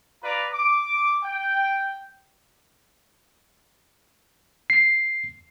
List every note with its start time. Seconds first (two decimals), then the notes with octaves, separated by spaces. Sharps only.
0.23 F4 B4 D5 A#5
0.53 D6
1.24 G5
4.70 C7